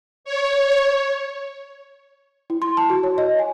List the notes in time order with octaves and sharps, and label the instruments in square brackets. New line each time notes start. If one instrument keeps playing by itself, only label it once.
[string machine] C#5
[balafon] E4
C6
A5
F#4
C#5
D#5
G#5